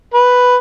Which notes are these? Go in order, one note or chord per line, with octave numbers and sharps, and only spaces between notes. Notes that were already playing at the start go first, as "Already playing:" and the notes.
B4